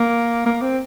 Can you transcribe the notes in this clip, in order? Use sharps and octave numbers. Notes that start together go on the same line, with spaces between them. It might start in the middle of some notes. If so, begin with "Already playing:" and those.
Already playing: A#3
A#3
C4